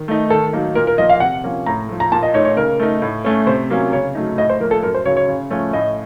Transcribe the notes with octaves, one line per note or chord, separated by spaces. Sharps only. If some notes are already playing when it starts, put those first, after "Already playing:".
Already playing: D#3
A3 D#4
D#3 A4
F#3 A#3 D#4
A#2 A#4
A#4
F3 A#3 D#5
F5
C3 F#5
F3 A#3 C#4
A2 A#5
F3 A3
A#5
A#2 A5
D#5
A3 D#4 C#5
C#5
C#3 A#4
A3 D#4
A2
A3 C#4
C3 C5
F#3 A#3 C#4
C#3 C#5
F#3 A3 D#4
A2 D#5
C5
F3 A#3 A#4
A4
F#2 A#4
C5
C#3 F#3 C#5
C#5
C#3
F3 A3 C#4
A2 D#5